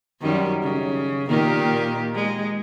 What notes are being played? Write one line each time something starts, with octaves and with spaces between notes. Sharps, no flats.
F#2 D#3 G3
C#3
A#2 D#3 G4
G#3